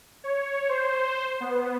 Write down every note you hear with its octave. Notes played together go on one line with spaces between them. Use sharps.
C#5
C5
B3